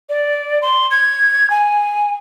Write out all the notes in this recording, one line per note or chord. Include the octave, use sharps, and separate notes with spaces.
D5
C6
G#6
G#5